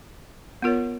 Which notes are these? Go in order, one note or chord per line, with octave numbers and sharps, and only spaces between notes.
B3 F4 A#4 C#5